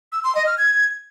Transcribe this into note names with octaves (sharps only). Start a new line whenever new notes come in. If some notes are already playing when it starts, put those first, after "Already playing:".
E6
C6
D#5
F6
G#6